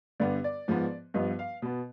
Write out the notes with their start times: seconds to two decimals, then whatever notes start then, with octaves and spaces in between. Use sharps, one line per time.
0.20 G2 D3 G3 B3 D5
0.44 D5
0.68 G#2 F3 B3
1.14 G2 F3 B3 D#5
1.39 F5
1.62 B2 B3